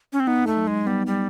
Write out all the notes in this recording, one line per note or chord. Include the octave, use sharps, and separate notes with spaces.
C#4
C4
B3 D#4
A3
F#3
G#3
G3 B3
G3